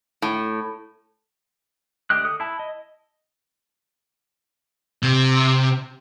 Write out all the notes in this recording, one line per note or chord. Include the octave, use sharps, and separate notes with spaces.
A2
D3 A3 G4 D#5 F#6
A4 D#6
E4 A5
D#5
C3